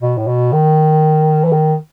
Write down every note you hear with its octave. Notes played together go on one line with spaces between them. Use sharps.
B2
A2
B2
D#3
E3
D#3